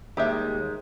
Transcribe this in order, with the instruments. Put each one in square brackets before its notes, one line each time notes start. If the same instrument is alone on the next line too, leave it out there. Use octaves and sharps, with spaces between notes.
[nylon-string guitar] D#2 G3 [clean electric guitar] G#3 D#4 [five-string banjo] G4 E5